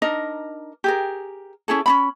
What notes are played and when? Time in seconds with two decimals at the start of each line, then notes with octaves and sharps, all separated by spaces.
0.02 D4 D#4 A#4 D#5
0.84 G4 G#4 A#4
1.68 C#4 E4 G#4 A4
1.86 C#4 D4 B5